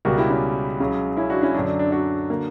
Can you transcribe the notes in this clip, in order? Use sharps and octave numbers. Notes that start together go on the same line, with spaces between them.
C#2 B2 G3 F#4 A#4
E4 G4
C#4 E4
C#2 C#3 F#3
C#4 E4
D4 F#4
C#4 E4
F#2 D3 F#3 D4
D4
D4
D4 F#4
D3 A#3